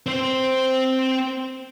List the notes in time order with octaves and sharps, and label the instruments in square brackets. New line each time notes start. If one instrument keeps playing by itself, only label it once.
[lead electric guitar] C4 C5